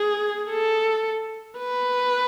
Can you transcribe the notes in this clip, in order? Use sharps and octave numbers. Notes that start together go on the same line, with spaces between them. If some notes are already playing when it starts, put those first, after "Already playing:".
Already playing: G#4
A4
B4